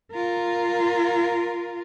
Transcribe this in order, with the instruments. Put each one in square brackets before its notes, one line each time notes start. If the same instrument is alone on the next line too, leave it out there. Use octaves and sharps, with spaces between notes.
[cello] F4 A#4